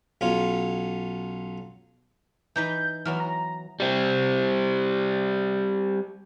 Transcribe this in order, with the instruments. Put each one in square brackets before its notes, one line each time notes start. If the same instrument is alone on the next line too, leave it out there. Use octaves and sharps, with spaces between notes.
[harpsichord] B1 C#4 F4
[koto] E3 D#4 B4 [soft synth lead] G6
[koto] E3 F#3 B3 [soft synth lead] F6
[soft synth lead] A#5
[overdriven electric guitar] G3 C4